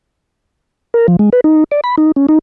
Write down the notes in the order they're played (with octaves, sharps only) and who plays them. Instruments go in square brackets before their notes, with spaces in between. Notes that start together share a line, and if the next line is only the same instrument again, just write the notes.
[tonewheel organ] A#4
F3
G#3
B4
D#4
D5
B5
D#4
C#4
D#4